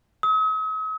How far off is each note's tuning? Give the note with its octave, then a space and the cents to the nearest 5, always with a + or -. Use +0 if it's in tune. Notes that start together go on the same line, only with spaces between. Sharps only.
D#6 +45